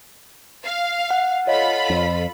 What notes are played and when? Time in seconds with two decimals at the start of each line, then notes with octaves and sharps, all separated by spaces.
0.64 F5
1.11 F#5
1.47 F4 A4 C#5 D#5 F5 B5
1.90 F2